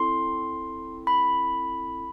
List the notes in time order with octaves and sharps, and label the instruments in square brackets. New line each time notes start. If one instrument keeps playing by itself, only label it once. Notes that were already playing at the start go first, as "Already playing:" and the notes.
Already playing: [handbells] C4 E4 A4 C6
B5